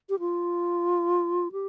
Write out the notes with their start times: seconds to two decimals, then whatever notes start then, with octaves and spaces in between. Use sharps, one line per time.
0.09 G4
0.19 F4
1.52 G4